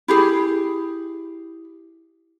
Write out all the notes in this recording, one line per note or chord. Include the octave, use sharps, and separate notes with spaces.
E4 G4 G#4